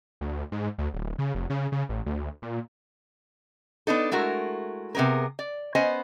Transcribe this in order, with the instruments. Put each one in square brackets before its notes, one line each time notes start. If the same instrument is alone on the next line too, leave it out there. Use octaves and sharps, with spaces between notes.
[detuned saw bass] D2
G#2
D2
D1
C#3
F1
C#3
C#3
A1
D2
A#2
[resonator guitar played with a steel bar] B3 D4 D#4 A4
G#3 A3 E4 F#4 A#4
C3 B3 D4 G#4 A#4
D5
B3 C#4 C5 D#5 G#5